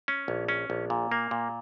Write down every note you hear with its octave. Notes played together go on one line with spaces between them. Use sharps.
C#4
A#1
C#4
A#1
A#2
A#3
A#2